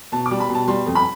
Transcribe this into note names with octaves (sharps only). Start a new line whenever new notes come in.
B2 A5
D6
G3
B5
B2
A5
G3 C6
F2
B5